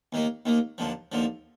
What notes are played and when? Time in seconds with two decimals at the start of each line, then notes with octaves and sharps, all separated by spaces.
0.13 D#2 D#3 A#3
0.46 D#2 D#3 A#3
0.78 D#2 D3 F3
1.12 D#2 D3 F3